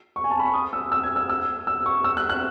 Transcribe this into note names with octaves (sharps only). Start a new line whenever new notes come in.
C#6
G#5
A5
B5
C#6
D#6
E6
E6
G#6
E6
E6
E6
C#6
E6
F#6
F#6